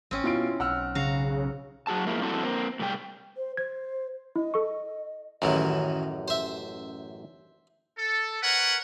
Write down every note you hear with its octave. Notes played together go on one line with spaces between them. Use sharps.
A1 C4 C#4
B2 E4 F4 D7
B1 F#5 E6 F6
C#3 F#4 F5 A#5
F#3 F#4 G#4 A5
F3 G#3 A#3 E4
F3 G3 C4 E4 F#4 A4
A#3 C4
A2 C3 G3 G#4 G5
C5
C5 G#6
E4 D#5
A4 C#6
A1 F#2 D#3 E3 F#3
C5 E5
A4
A#4 B4 C#5 F#5